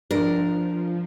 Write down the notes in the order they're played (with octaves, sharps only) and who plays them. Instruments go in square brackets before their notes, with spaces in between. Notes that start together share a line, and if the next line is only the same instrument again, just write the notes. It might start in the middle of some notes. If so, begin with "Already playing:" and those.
[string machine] F3 [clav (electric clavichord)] D4 [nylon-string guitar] A#4